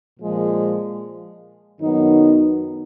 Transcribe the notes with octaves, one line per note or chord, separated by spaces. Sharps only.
A#2 F3 G#3
F#2 D#3 F#3 B3 D#4